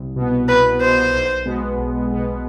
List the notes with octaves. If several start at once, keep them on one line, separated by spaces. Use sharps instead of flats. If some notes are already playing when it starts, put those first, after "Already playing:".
Already playing: C2
B2
B3
C2 B4
B2 B3 C5
B1
B2 G#3 B3
B1
B2 G#3 B3